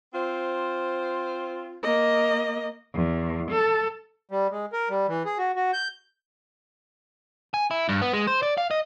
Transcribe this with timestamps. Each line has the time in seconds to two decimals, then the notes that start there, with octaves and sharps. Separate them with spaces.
0.13 C4 F4 C5
1.83 A#3 D#5
2.94 E2
3.51 A4
4.31 G3
4.51 G#3
4.73 A#4
4.90 G3
5.08 E3
5.25 G#4
5.38 F#4
5.55 F#4
5.73 G6
7.54 G#5
7.71 E4
7.89 G2
8.02 B3
8.13 G#3
8.27 C5
8.43 D5
8.58 F5
8.71 D#5